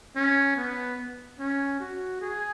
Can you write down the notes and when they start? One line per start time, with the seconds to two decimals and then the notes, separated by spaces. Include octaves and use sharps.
0.16 C#4
0.57 B3
1.39 C#4
1.80 F#4
2.21 G#4